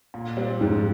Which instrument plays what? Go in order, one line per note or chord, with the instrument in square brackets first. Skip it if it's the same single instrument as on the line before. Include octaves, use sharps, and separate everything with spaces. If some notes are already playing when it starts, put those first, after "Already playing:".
[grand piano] A#2
G3 C4
[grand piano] F2 [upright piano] G#2